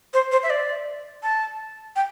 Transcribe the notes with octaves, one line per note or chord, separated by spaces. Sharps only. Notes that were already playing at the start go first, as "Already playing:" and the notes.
C5
C5
E5
D5
A5
G5